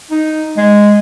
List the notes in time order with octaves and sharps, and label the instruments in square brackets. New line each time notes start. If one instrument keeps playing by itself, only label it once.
[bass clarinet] D#4
G#3